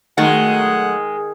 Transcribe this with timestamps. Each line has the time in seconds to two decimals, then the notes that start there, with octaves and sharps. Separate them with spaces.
0.18 D#3 F#3 G#3 A3 G#4 F#5